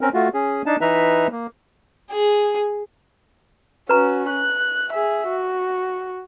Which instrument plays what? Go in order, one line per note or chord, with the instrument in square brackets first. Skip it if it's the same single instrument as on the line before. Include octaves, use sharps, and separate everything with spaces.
[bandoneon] C4 C#4 A#4
A3 F4 F#4
C#4 G#4
D4 D#4 A5
E3 D#4 B4 E5 A#5
A#3
[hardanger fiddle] G#4
[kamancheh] C#4 F#4 [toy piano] B4 A#5
[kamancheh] F#6
G#4 E5
F#4